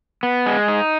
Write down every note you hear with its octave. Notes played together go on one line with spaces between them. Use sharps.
B3
G#3
D#4